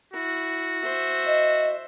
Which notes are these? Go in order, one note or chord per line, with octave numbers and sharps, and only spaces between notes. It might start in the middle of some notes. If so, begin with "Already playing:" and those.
E4 F#4
C5 E5
D#5